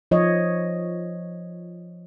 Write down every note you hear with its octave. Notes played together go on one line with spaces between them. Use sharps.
F3 C#5 D#5